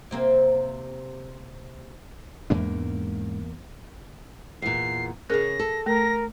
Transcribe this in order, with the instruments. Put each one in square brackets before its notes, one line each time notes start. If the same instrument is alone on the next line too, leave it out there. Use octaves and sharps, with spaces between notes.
[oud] C3 A#3 C4
[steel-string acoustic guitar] E2 A#3 [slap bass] G#2 G#3 D4
[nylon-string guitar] E2 A#2 [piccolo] C7
[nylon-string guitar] C#3 C#4 [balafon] G#4 A#4 [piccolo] A#6
[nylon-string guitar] A4
[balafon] A3 [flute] A#4 [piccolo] A#6